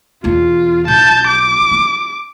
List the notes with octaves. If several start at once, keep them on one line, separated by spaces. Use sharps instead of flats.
B1 E2 F4
B1 F#3 A5 G6
D6
C#4